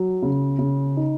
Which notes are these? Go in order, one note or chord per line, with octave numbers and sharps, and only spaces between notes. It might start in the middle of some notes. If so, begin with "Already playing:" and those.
Already playing: F#3
C#3
C#3
D#4